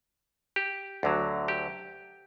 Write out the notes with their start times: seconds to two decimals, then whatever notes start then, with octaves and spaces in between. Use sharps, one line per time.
0.56 G4
1.03 D2 D3 F#3
1.48 G4